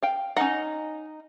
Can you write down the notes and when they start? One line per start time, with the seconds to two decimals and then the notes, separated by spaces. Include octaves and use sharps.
0.03 F5 G5
0.37 C#4 D#4 F#5